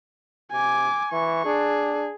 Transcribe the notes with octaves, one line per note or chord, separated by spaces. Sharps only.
C3 G#5 D6
E3 C#6
D4 G#4